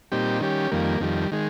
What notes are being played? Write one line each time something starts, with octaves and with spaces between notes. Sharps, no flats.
A#2 G3 C4 D#4 G4
D#3 G3 C#4 G4
F2 D#3 G3 A#3
F2 D#3 G3
D#3 G#3